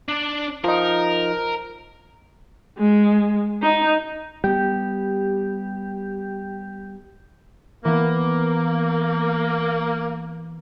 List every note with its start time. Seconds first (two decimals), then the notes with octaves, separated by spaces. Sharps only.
0.09 D4 D5
0.64 F3 D#4 A#4
2.79 G#3
3.62 D#4
4.44 G3 B3 G4
7.85 E3 A#3 B3